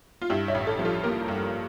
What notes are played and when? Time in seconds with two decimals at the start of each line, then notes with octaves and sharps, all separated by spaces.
0.22 F4
0.30 G2 E4 G4
0.48 C#5 E5
0.55 A1
0.67 A4 C#5
0.79 F3
0.85 F4 A4
1.03 A#3 G4 A#4
1.28 G2